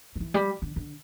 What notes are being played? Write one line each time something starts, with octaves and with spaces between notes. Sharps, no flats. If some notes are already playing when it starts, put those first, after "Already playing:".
G3
E3
G3
D3
D3